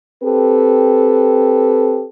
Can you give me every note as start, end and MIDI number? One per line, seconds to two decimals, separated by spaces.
0.23 2.05 60
0.23 2.05 67
0.23 2.05 69
0.23 2.05 71